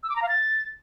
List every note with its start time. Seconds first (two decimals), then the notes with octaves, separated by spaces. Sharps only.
0.03 E6
0.10 D6
0.16 A#5
0.22 F5
0.29 A6